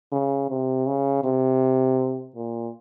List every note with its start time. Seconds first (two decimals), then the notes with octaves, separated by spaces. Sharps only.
0.12 C#3
0.50 C3
0.87 C#3
1.24 C3
2.36 A#2